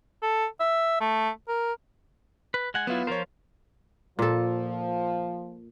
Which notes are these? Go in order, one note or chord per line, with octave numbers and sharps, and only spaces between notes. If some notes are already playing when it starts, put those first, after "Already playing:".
A4
E5
A3
A#4
B4
G#3 F#5 G#5
F#3 B3 E4 F4
F3 F4 A#4 C5 C#5
A#2 F3 A4